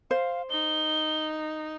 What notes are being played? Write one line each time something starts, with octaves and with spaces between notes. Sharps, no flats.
C5 F5
D#4 G7